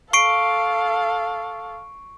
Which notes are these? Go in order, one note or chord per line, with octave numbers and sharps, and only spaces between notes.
A4 F5 C#6 C7 D7